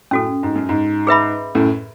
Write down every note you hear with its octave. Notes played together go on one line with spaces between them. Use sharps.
F#2 A2 C#4 F#4 A4
G#2
F#2
G#2
G#4 B4 E5 B5
F#2 A2